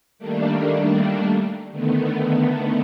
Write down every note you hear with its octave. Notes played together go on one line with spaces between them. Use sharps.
D#3 G3 A3 A#3 D4
D3 D#3 A3 B3